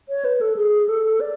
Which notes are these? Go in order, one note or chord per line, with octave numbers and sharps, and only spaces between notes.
C#5
B4
A4
G#4
A4
D5